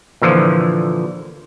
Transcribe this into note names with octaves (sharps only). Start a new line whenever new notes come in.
A#2 D3 E3 F3